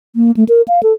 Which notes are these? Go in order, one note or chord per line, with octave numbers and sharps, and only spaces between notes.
A#3
A3
A#4
F5
A4